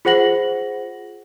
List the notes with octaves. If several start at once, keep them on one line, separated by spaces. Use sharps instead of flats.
F4 G#4 C5 F#5 A#6 F#7